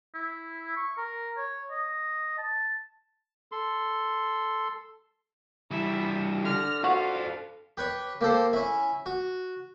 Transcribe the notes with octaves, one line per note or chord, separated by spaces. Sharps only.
E4
C#6
A#4
C#5
D#5
A5
A4 C6
E3 G3 E4 E5
D3 F6 A#6
F#4 A4 C5 F5
G4 B4 C#5
A#3 G4 A4 C5
C#4 E4
F#4